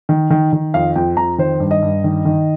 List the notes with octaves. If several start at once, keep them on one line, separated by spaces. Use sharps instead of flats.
D#3
D#3
D#3
F2 F5
F2 G5
F2 A#5
D#3 C5
G2
D#5
G2
D#3
D#3